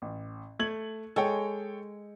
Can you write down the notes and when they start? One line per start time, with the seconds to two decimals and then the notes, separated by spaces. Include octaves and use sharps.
0.02 A1
0.59 A3 G#6 F#7
1.16 G#3 A4 C#5 G5